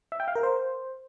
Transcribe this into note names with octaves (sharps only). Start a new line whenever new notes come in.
E5
G5
F5
A#4
C5